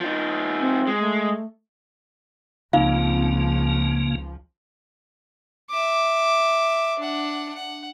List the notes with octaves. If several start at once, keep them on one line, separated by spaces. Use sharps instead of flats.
F3 D#4
C4
G#3
A3
C#2 C#3 F3 A#3 C4 D#4 F4 F5
E5 D6
D4 F#5
F#5